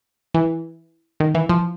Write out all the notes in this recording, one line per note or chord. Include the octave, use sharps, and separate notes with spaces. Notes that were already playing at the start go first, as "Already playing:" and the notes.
E3
D#3
E3
F3